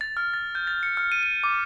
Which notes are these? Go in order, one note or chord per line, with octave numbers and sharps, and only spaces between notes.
A6
F6
A6
G6
A6
C#7
F6
D#7
D#7
D6